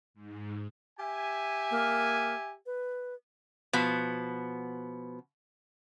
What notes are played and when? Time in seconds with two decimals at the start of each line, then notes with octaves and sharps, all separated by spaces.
0.14 G#2
0.99 G4 E5 G#5
1.71 A#3
2.66 B4
3.73 B2 F3 B3